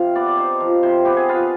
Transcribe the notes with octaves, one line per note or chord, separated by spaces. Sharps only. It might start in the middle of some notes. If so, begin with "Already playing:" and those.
Already playing: C3 F3 F5
B3 D5
D5
D#4 C5
F3
C3 C5
B3 G4
G#4
F4 B4